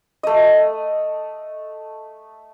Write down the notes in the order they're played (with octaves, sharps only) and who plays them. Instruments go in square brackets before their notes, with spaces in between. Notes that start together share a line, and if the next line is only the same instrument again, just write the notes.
[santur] A3 D#5